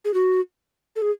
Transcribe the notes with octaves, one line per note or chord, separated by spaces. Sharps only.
G#4
F#4
A4
G#4